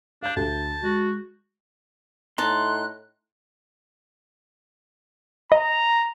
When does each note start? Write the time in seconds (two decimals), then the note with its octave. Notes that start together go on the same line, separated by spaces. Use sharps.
0.23 D4 F5 G6
0.36 D2 A5
0.83 G#3 F#4
2.38 A2 D#4 A5 C6 F#6
5.52 D#5 A#5